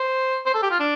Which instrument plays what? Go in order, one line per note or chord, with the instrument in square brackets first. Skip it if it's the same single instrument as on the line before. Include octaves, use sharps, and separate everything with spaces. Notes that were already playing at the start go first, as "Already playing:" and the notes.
Already playing: [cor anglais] C5
C5
A4
G4
F4
D4